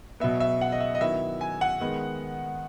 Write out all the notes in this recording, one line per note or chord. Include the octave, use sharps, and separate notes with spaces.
B2 F#3 B3 E5
E5
F#5
D#5
E5
D#5
D#3 F#3 B3 E4 E5
G#5
F#5
D#3 G#3 B3